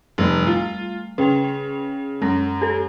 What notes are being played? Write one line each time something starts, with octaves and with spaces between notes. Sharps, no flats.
F1 G3 A3
F4
C#3 B4 G5 F7
F#2 G#3 A#6
G4 A4